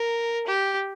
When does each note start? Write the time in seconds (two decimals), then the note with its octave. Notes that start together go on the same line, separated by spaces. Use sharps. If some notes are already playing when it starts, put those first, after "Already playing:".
Already playing: A#4
0.47 G4